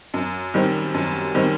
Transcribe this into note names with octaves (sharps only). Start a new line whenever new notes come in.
F#2
D#3 G3 C4
F#2
D#3 G3 C4